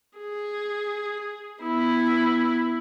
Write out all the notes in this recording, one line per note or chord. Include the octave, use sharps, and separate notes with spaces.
G#4
B3 E4